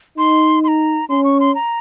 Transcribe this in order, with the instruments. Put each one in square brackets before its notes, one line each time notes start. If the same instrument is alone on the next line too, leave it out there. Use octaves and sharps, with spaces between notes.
[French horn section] D#4 [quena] C6
[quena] C6
A#5
[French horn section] C#4 [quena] C6
[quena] C#6
C6
A#5